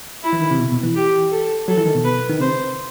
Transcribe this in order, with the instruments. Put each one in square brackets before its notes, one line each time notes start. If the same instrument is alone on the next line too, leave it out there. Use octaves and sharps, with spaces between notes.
[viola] E4
[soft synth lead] E3
D#3
C3
B2
B2
E3
[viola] G4
A4
[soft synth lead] F#3 [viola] A4
[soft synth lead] E3
D#3
B2
[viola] B4
[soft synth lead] D#3
[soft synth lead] C3 [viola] C5